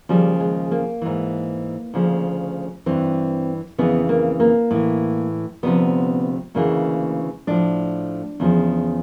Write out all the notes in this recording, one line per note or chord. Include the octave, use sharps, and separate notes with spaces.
D#2 C#3 F3 G3
G#3
A#3
G#2 E3
D2 C#3 F3
G2 E3 C4
F2 C#3 E3 B3
A#3
A#3
A2 E3
D2 C3 F3 B3
D2 C#3 E3 A#3
A2 F3 D4
E2 C#3 F3